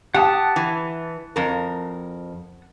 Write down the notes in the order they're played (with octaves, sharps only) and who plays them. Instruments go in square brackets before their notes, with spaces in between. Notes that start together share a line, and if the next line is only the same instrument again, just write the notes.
[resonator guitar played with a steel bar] G4 [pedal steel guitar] F#5 A5 D#6
[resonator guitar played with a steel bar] E3
F2 A#4